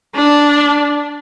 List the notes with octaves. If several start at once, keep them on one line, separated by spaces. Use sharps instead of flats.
D4